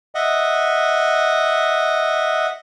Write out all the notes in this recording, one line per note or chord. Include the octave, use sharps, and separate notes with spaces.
D#5 E5 F#5